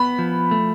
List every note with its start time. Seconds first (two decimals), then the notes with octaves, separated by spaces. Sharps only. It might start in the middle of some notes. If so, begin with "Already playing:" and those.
Already playing: B3 B5
0.19 F3
0.51 A3